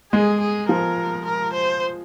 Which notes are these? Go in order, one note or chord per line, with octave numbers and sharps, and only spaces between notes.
G#3 G#4
G#4
F3 A#4
A#4
C5